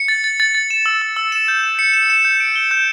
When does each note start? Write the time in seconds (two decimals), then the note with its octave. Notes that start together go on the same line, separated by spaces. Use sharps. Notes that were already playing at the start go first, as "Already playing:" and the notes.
Already playing: C#7
0.08 A6
0.24 A6
0.40 A6
0.55 A6
0.70 E7
0.86 E6
1.02 E6
1.17 E6
1.32 E7
1.48 G6
1.63 E7
1.79 C#7
1.93 E7
2.10 E7
2.25 G6
2.40 D7
2.56 G7
2.71 G6